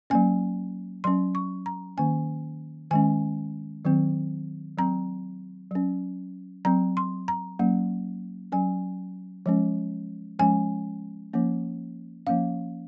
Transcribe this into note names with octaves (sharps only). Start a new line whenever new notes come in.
F#3 A#3 C#4 G#5
F#3 C#4 C6
C#6
A#5
D#3 A#3 C#4 G#5
D#3 G#3 C#4 G#5
D#3 F#3 C4
F#3 C4 A#5
F#3 C#4
F#3 C4 A#5
C6
A#5
F#3 A#3 C#4
F#3 C#4 G#5
F3 G#3 C#4
F3 G#3 C#4 G#5
F3 A#3 C#4
F3 A#3 C#4 F5